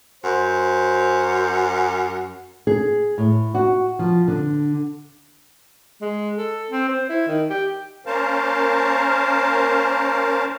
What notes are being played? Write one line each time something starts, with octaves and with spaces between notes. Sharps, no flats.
F#2 C5
G#4
A2
F#4
F3
D3
G#3
A4
C4
C5
E4
D#3
G4
A#3 C#4 A#4 C5 F5 A5